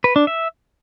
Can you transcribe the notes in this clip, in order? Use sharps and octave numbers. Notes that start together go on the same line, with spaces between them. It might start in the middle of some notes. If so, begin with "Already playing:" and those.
B4
D4
E5